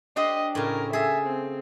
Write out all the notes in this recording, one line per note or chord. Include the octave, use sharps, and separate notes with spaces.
D4 G4 C5 D#5
A2 C#3 A#4
G#4 A4 E5
C4